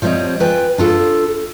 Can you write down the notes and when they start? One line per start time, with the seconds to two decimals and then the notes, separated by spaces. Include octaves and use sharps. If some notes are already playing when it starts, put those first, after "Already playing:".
0.02 F3 G3 C4 B4 C#5 D#5
0.40 F4 B4 G5 G#5
0.78 D4 F4 A4